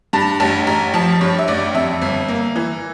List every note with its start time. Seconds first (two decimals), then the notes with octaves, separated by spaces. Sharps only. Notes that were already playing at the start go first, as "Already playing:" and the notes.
0.13 G2 A5
0.40 A1 A5
0.67 A1 A#5
0.94 F3 A5
1.21 G2 C#5
1.39 E5
1.48 A1 D5
1.74 F2 E5
2.02 G1
2.28 A#3
2.56 E3